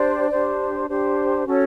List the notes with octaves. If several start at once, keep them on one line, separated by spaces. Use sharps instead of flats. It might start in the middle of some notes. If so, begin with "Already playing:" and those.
Already playing: D4 G4 C5 D5
D4 G4 C5
D4 G4 C5
C#4 F#4 A4 C#5